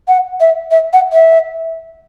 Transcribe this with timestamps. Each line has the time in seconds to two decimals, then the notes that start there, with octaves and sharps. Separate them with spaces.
0.08 F#5
0.40 E5
0.71 E5
0.93 F#5
1.13 E5